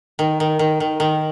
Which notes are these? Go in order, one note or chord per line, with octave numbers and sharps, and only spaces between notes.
D#3
D#3
D#3
D#3
D#3